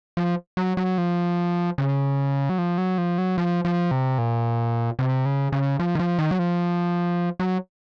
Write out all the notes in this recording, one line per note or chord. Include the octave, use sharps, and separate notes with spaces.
F3
F#3
F#3
F3
C#3
F#3
F3
F#3
F3
F#3
F3
F3
C3
A#2
C3
C#3
C#3
F3
D#3
F3
D#3
F#3
F3
F#3